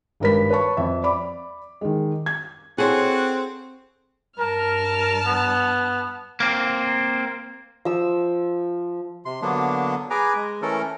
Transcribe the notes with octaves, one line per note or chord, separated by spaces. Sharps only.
G#1 G2 A#4 B4 B6
B4 C#5 A5 C#6
F2 E5
D5 B5 D6
D#3 G#3
G#6
C4 E4 F#4 G#4 A4 C#5 C6
G2 A#4 A5 F6
B3
A#3 C4
F3 E6
C3 C6
D3 F#3 A#3 B3 D4
G#4 B4 G#5 A#5 D6
G#3
E3 A3 C#4 A4 A#4